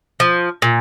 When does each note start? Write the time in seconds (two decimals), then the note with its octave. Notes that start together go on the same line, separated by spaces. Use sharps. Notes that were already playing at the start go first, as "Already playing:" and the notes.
0.20 F3
0.62 A#2